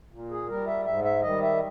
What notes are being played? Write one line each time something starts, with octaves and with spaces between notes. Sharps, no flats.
A#2
G#4
G3 A#4
E5
G#2 E5
E5
D#3 G3 D#5
E5